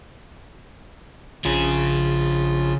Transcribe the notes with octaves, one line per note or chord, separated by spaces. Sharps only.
A#1 C#3 F4 G#4